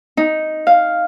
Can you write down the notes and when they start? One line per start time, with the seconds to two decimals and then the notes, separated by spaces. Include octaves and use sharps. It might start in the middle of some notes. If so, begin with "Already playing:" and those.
0.17 D#4
0.67 F5